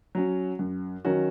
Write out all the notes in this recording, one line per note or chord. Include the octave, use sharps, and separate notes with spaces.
F#3 C#4
F#2
D#3 F#3 C#4 F#4